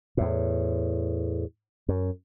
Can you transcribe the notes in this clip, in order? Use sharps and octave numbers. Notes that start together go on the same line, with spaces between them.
E2 A2
F#2